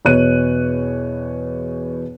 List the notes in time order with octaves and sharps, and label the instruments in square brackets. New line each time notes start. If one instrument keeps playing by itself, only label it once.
[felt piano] E2 B2 C#5 F#6 D#7